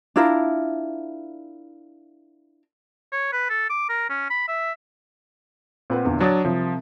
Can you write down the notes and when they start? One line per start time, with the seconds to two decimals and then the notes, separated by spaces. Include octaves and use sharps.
0.16 D4 E4 F4 A#4
3.12 C#5
3.33 B4
3.50 A4
3.70 D6
3.89 A#4
4.09 C#4
4.30 B5
4.48 E5
5.90 A#2 C4 B4 F#5
6.05 E2 D3
6.20 F#3 D4 C#5 D#6 A6
6.45 C2 F3